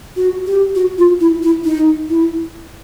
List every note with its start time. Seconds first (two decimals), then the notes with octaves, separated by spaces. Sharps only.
0.16 F#4
0.47 G4
0.75 F#4
0.98 F4
1.20 E4
1.43 E4
1.65 D#4
2.09 E4